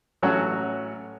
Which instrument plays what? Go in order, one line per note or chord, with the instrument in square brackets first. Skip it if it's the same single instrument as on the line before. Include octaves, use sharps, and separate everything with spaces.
[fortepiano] A1 F#3 C#4 F#4